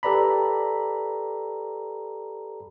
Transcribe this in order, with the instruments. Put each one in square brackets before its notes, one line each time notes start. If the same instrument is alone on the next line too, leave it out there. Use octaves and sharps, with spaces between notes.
[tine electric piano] G4 A4 B4 D5 A#5 B5